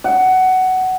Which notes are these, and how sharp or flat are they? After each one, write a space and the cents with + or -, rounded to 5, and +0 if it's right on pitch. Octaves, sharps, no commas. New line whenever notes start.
F#5 +15